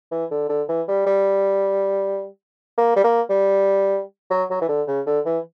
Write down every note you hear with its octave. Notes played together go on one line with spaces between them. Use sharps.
E3
D3
D3
E3
G3
G3
A#3
G3
A#3
G3
F#3
F#3
E3
D3
C#3
D3
E3